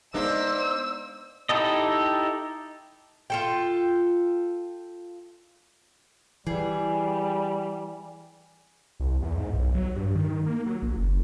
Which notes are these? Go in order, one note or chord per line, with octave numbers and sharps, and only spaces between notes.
G#3 A#3 B3 D4 D#4 C5 E6
D#4 E4 G4 A4 D#5
F4 A4 G5
E3 G3 G#4
C2
E2
G#2
B1
F#3
G2
D#3
A#3
F#3
A#1
F#1